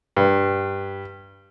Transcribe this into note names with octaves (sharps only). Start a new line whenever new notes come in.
G2